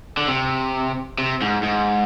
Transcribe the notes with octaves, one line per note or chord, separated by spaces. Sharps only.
D3
C3
C3
G#2
G#2